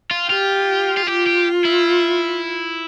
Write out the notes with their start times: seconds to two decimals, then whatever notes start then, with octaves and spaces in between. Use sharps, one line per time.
0.11 F4
0.30 F4 G4
0.97 F4
1.07 F4 G4
1.27 G4
1.65 E4